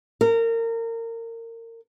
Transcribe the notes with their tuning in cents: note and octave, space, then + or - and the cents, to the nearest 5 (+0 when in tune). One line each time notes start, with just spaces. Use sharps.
A#4 -25